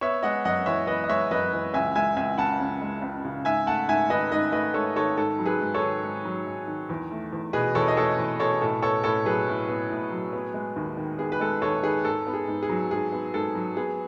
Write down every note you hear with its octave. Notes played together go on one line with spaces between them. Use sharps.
B3 C#5 E5
G#3 D#5 F#5
F#2 D#5 F#5
E3 C#5 E5
B3 B4 D#5
D#5
G#3 C#5 E5
F#2 B4 D#5
E3
C#2 E5 G#5
G#3 E5 G#5
C#2 E5 G#5
C#3 F#5 A5
C#2
G#3
C#2
C#3
G#2 E5 G#5
A3 F#5 A5
G#2 E5 G#5
D#3 B4 D#5
G#2 B4 D#5
A3 B4 D#5
G#2 A4 C#5
D#3 A4 C#5
G#2 A4
F#3
G#4 B4
G#2
A4 C#5
D#3
G#2
F#3
G#2
D#3
E2
A3
E2
B2 G#4 B4
E2 A4 C#5
D#5
A3 A4 C#5
E2
B2 A4 C#5
A2 A4
B3 A4 C#5
A2 A4 C#5
F#3 G#4 B4
A2
B3
A2
F#3
B3
G#3
D#2
D#3
B3 G#4
B4
G#3 A4
D#2 A4 C#5
D#3 G#4 B4
G#2 A4
B3
G#4
G#2
G#4
F#3
G#2 G#4
B3
G#2 A4
F#3
B3 G#4